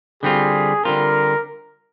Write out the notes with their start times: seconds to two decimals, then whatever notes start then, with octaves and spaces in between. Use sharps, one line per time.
0.23 D3 G3 C4 F4 G#4
0.84 D3 G3 C4 F4 A#4